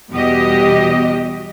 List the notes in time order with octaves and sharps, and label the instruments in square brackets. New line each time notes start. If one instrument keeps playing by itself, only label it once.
[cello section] E2 B2 G3 F#4 G4 D#5